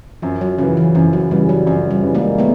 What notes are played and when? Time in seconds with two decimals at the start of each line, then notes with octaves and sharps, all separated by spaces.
0.22 F#2 F3
0.41 F#3
0.58 C#3 E3 F3
0.77 E3
0.95 F#2 E3
1.13 F#3
1.31 C#3 E3 G3
1.49 F#3
1.66 F#2 F3
1.91 G3
2.03 C#3 E3
2.15 G#3 A#3
2.38 A3 B3